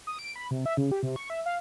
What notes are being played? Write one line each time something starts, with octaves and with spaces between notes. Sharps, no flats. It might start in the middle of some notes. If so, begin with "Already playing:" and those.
D#6
D7
B5
C3
E5
C#3
G4
C3
C#6
E5
F5